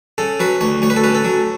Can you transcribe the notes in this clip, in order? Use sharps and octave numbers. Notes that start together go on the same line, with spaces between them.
C#3 A4
F#3 B4
D2 C#5
D2 C#5
B4
A4
C#3 B4
A4
F#3